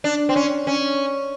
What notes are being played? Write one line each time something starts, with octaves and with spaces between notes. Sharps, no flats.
D4
C4
C#4
C#4